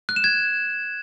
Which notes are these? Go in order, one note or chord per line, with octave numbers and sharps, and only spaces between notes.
F#6
E7
G#6